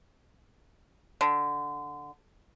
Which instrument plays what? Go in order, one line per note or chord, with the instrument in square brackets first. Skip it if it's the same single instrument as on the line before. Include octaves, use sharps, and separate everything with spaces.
[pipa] D3